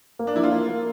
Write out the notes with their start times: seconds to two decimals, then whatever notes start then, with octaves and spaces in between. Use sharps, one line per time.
0.19 A#3
0.27 D4
0.36 F3 E4
0.43 F4
0.52 A#3
0.69 A#3